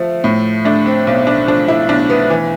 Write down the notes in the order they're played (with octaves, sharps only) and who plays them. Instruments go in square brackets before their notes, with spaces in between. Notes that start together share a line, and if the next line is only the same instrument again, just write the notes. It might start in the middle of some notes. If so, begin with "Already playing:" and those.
Already playing: [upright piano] F3 A3
A2
A3 D4
C4
B1 C4
D4
F3 D4
E4
B1 D4
B3
E3